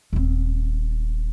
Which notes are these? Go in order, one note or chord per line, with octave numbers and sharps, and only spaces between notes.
D#1 C4